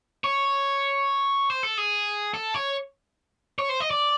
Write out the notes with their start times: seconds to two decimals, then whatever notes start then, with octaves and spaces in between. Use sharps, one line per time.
0.24 C#5
1.50 C5
1.63 A4
1.78 G#4
2.34 A4
2.54 C#5
3.59 C#5
3.69 C5
3.80 D#5
3.91 D5